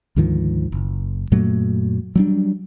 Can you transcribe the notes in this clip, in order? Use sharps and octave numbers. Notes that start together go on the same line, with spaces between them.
D2 G#2 D#3 F3
F#1
F#2 A#2 F#3 A3
F#3 G3 D4